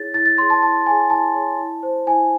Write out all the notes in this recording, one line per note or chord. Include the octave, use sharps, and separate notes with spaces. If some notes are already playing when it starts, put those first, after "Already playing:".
Already playing: E4 G#4 C#5 A6
E4 A6
A6
G#4 C#5 C6
A5
E4 A5
G#4 C#5 G#5
E4 A5
G#4 C#5
E4
C5
E4 G#5